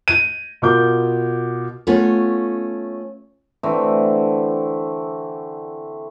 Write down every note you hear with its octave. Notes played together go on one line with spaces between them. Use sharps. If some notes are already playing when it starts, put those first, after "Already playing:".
D#7
B2 F4 A#4 D6 G6
A3 B3 C#4 F4
D3 E3 A3 C4